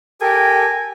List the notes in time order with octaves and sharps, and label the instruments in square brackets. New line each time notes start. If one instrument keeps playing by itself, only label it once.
[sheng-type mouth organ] G4 A4 A#4 [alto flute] G5 [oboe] G#5